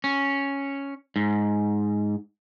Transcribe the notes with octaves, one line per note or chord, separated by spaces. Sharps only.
C#4
G#2